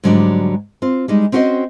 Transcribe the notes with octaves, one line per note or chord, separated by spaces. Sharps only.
G#2 D3 F#3 G3 C4 D4
C4 F4
G3 G#3 D#4
C4 C#4 F#4 G4 C5 D#5